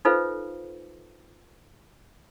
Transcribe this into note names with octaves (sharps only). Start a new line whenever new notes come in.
D#4 F4 A4 B4 C5 F5